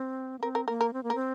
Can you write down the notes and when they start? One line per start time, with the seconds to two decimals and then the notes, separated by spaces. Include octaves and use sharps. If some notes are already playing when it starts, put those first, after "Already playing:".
Already playing: C4
0.39 A#3
0.43 C4 A#4
0.55 A#4
0.68 A#3 A#4
0.81 A#4
0.93 C4
1.03 A#3
1.10 A#4
1.15 C4